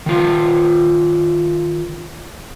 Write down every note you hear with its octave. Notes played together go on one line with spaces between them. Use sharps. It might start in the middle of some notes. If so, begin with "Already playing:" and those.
D#3 F4